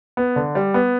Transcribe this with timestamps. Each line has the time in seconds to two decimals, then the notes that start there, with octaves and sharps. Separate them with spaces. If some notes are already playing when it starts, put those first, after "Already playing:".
0.17 B3
0.36 D3
0.55 G3
0.74 B3